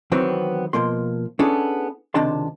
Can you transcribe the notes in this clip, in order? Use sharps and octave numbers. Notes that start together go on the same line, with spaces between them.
D#3 E3 F#3 B3 C4
B2 F3 A#3 C6
B3 C#4 D4 E4 G#4 A4
C#2 C3 D#3 D4 A5 C6